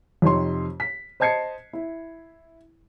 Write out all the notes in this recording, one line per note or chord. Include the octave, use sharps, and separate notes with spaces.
F2 C3 D#4 C#5 C6
B6
C5 D#5 A5 G#6 C7 C#7
E4